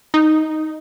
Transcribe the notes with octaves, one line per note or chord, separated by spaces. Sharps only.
D#4